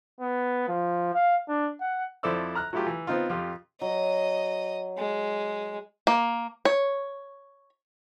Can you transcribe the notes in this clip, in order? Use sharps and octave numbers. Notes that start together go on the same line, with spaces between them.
B3
F3
F5
D4
F#5
F2 E4 A4 C5 D5 E6
A#5 F6 F#6
F#3 A3 E4 F4 G4
E3
B3 C4 D#4 F4
F2 F4 G4
F#3 D#5
G#3
A#3
C#5